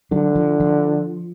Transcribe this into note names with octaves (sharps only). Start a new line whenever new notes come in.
D3 F#3
F3
F3